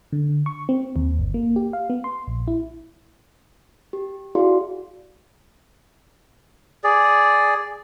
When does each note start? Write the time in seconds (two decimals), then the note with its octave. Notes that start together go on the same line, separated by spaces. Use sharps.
0.12 D3
0.46 C#6
0.69 C4
0.96 D#2
1.19 G1
1.34 A#3
1.56 G4
1.73 F5
1.90 B3
2.04 C6
2.27 A#1
2.48 E4
3.93 G4
4.35 E4 F#4 G#4 D5 F5 C6
6.84 G#4 D5